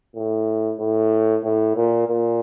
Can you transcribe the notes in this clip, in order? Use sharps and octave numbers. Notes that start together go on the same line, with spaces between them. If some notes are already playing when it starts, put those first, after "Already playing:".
A2
A2
A2
A#2
A#2